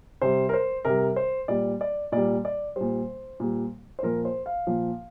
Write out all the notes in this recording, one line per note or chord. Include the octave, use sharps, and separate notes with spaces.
C3 G3 C5
A#4
C5
C3 G3 A#4
C5
A#2 G3 D5
D5
A#2 G3 D5
D5
A#2 G3 C5
A#2 G3
C5
A#2 F3 A#4
C5
F5
A#2 F3